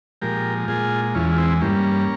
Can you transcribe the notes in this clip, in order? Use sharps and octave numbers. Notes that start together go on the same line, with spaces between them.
A#2 F3 G#3 G4 A#4
A#2 G#3 F4 G#4
E2 E3 G#3 C#4 F4
F4
C4 E4
G2 G3 A#3 C#4